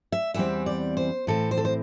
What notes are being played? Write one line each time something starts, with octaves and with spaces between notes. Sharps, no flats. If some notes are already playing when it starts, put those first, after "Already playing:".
E5
E2 E3 G3 C4 E5
D5
C5
A2 E3 C4 A4
C5
A4
C5